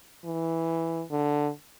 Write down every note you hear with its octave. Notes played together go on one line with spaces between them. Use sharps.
E3
D3